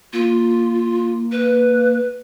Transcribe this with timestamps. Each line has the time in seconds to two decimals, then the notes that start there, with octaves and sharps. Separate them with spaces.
0.13 A#3 F4
1.32 B4